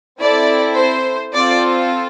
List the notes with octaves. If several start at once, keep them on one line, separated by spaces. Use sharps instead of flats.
C4 E4 A4 D5
C5
C4 F4 A4 D5